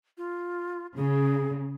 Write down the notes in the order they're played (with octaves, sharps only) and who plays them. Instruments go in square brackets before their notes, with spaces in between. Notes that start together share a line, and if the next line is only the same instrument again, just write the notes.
[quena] F4
[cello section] C#3 [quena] G#4